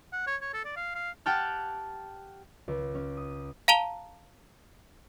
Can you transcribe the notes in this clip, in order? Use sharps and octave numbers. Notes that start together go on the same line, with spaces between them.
F#5
C#5
C#5
A4
D5
F5
F5
G4 F#5 G5 A5 F6
C#2
C#4
D#6
F5 A5 A#5 D#7 F7 G7